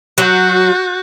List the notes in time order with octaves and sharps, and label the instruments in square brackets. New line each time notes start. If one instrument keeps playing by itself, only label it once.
[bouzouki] F#3 [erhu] F#4 [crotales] F#6 G6